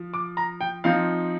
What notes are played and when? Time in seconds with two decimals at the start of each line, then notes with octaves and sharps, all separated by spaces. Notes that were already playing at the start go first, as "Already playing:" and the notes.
Already playing: F3
0.14 D6
0.37 A#5
0.61 G5
0.84 F3 C4 D#4 F5